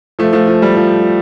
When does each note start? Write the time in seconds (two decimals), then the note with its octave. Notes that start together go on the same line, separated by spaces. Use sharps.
0.19 F3 A3
0.33 F3 A3
0.47 F3
0.62 G3
0.76 F3